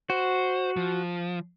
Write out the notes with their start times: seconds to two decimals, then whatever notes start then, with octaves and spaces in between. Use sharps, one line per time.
0.10 F#4 C5
0.77 F3